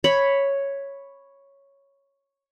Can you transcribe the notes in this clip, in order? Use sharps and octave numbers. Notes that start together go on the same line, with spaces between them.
C#5 B5